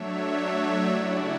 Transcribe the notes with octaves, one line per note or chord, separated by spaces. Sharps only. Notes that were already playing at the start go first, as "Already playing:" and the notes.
Already playing: F#3 A3 D4 C#5 E5
C#3 G3 C#4 E4 D5 F#5